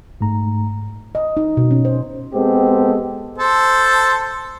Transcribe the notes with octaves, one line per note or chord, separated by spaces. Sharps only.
G#2 A3 A#5
D#5
D#4
B2
C#4
C5
G#3 B3 C4 G4 A4
A4 C5 A5